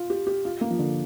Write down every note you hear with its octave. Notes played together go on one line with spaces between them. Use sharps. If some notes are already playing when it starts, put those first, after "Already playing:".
Already playing: F4
G4
G4
F4
A#3
F3
D3